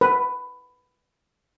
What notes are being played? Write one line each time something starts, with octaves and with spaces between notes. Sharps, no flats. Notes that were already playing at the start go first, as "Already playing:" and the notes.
B4